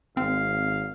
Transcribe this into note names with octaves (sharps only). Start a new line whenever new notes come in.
G#1 C4 F5